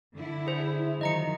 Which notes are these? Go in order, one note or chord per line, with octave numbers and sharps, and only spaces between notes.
D3 E4
G#4 C5
D#3 F3 F#3 D#5 A#5 C#7